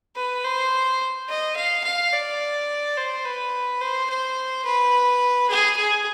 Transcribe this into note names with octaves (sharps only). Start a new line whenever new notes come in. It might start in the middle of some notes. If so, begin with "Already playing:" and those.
B4
C5
D#5
F5
F5
D5
C5
B4
C5
C5
B4
G#4
G#4